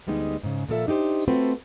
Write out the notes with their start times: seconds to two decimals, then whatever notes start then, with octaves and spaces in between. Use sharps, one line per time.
0.07 D2 G3 G#3 B3 D#4
0.43 G#2 C#3
0.68 A#2 F3 A4 E5
0.87 D4 D#4 F#4 G4 C5
1.28 A3 C4 F4 F#4 A4 B4